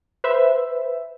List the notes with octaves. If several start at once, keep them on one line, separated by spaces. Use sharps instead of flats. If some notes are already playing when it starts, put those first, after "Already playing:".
B4 C5 E5